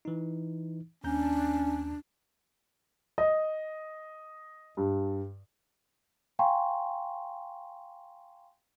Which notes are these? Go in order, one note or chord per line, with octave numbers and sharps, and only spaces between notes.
E3 D#4
D#2 C#4 D4 A#5 G6
D#5
G2
F5 G5 G#5 A#5 C6 C#6